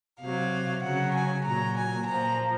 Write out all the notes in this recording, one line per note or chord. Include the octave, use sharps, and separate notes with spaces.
C3 F#3 F5
C#3 F#3 F#5
G#5
A#2 F#3 A#5
G#5
A#2 F3 A#5